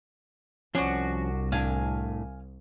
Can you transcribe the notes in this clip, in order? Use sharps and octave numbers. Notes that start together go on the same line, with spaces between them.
C2 F3 C#4 D4 F#4
A2 D4 F5 G#5